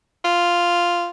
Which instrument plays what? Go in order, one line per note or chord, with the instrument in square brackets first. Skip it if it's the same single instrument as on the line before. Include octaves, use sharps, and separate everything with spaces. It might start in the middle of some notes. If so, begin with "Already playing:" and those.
[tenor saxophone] F4